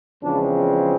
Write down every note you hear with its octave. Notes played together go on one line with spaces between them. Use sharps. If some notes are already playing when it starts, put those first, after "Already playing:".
E2 C#3 F3 G#3 C4 D4